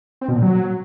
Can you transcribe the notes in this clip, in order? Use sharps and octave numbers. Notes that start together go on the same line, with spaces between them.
C4
B2
A#2
F#3